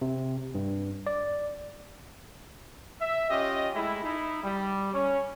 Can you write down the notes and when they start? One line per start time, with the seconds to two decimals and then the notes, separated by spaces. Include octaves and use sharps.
0.02 C3
0.55 G2
1.07 D5
3.00 E5
3.30 C#4 F4 G4 D#5
3.74 G#3 A3 E4
4.04 D#4 E4
4.43 G3
4.94 C#4